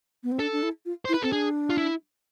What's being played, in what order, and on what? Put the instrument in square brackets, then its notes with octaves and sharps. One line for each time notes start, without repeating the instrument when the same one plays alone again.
[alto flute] B3
C4
[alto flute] D4 [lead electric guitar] A4
[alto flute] D4
E4
F4
[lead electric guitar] C5
[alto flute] E4
[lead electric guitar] B4
[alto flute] C4 [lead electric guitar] A4
[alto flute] D4 [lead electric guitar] G#4
[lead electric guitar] F4
E4